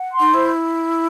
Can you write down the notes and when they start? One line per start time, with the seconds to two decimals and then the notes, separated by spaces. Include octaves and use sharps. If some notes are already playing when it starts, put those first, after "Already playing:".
Already playing: F#5
0.13 C6
0.20 D#4
0.34 E4 C5